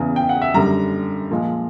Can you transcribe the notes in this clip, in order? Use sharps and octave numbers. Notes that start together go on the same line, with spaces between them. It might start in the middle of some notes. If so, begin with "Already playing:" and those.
Already playing: E2 C#3 E3
G5
F#5
E5
F#2 D3 G3 A#5
A#2 F3 G#3